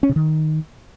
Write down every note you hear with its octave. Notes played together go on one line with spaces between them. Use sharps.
C#4
C3
D#3